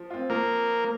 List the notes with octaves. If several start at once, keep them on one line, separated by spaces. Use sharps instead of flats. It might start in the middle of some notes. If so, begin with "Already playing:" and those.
Already playing: F3
C4 F4
F3 A#3